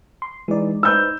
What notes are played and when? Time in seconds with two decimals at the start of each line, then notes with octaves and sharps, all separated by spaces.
0.22 C6
0.48 E3 G#3 D#4 D5
0.83 D#4 B4 C5 E6 G6